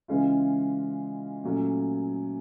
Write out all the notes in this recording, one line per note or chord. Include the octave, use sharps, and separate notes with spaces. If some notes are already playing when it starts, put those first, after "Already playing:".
C#3 E3 G#3 C#4 F4
A#2 F#3 A3 C#4